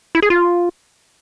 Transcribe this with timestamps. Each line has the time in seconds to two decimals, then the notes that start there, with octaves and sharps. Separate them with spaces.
0.15 E4
0.22 G#4
0.30 F4